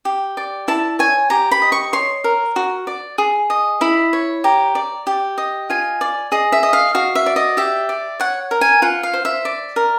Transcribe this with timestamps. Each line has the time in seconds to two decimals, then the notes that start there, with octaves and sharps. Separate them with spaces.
0.05 G4
0.37 D5
0.68 E4 A5
0.99 C#5 G#5
1.30 G4 A#5
1.51 B5
1.62 D#5
1.72 C#6
1.93 C#5 C6
2.24 A#4
2.56 F#4
2.87 D5
3.18 G#4
3.50 D#5
3.81 E4 B5
4.13 C#5
4.44 G4 A#5
4.75 D5
5.07 G4
5.38 D#5
5.70 F4 G#5
6.01 D5
6.32 G#4 D#5
6.52 E5
6.63 D#5
6.73 F5
6.95 F#4 F5
7.15 E5
7.26 D5
7.36 D#5
7.57 G4 E5
7.89 D5
8.20 C#5 F#5
8.51 A#4
8.61 G#5
8.82 F4 F#5
9.03 F5
9.13 C5
9.25 E5
9.45 D5
9.76 A#4